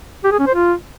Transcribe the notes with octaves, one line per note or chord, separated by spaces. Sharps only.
G4
G#4
C#4
C5
F4